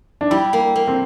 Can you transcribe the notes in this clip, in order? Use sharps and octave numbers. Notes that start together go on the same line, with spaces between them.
D4
G3 E4
A#3
A#3
C4